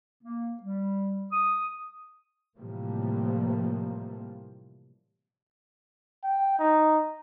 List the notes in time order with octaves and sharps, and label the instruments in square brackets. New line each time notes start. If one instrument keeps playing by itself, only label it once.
[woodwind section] A#3
G3
D#6
[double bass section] A2 C3 E3 F3 G3 A#3
[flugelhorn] G5
D#4